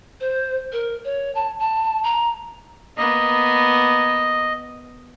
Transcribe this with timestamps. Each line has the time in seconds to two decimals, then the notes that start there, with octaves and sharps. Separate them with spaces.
0.20 C5
0.72 A#4
1.05 C#5
1.35 A5
1.60 A5
2.03 A#5
2.98 A#3 B3 D#5